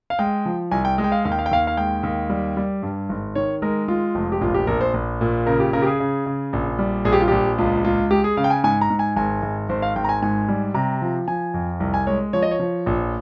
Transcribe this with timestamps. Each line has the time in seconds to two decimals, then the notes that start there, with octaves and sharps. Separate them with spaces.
0.10 F5
0.19 G#3 G5
0.46 F3
0.71 C2 G#5
0.85 G5
0.98 G#3
1.04 G5
1.12 F5
1.25 D#2 F5
1.32 G5
1.39 F5
1.46 G5
1.51 D#2 F5
1.67 F5
1.77 G#3 G5
2.03 D#2
2.30 G3
2.57 G3
2.83 G2
3.09 G#1
3.35 D#3 C#5
3.62 G#3 A#4
3.88 G#3 F4
4.15 F1
4.32 G4
4.41 A#1 F4
4.54 G4
4.67 A#1 A#4
4.81 C5
4.94 A#1
5.21 A#2
5.46 C#3 A#4
5.60 G4
5.73 C#3 A#4
5.82 G4
5.86 G#4
6.00 C#3
6.26 C#3
6.53 A#1
6.79 G3
7.05 A#1 G#4
7.13 G4
7.20 F4
7.28 A#1 G4
7.58 C#2 F4
7.84 C#2 F4
8.10 G#3 G4
8.24 G#4
8.37 C#3 F5
8.44 G5
8.50 G#5
8.64 G#2 G#5
8.81 A#5
8.90 G#2
8.99 G#5
9.16 G#1 G#5
9.42 G#1
9.69 G#1 C5
9.82 F5
9.96 G#1 G5
10.04 A#5
10.09 G#5
10.22 G#2 G#5
10.48 G3
10.74 C3 A#5
11.02 F3
11.28 F3 G#5
11.54 F2
11.80 C2
11.94 G#5
12.07 G#3 C#5
12.33 F3 C#5
12.43 D#5
12.51 C#5
12.60 F3
12.86 A#1